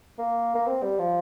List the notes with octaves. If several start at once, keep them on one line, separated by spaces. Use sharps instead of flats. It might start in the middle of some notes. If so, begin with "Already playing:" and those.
A#3
A#3
C4
G3
F3